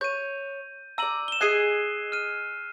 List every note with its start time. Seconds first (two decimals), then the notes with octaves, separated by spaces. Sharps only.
0.01 C#5 G6 D#7
0.98 D5 A#5 E6 D#7 F#7
1.28 E7 G7
1.41 G#4 D#5 G#5 F#6 C7 D#7
2.12 F6 D#7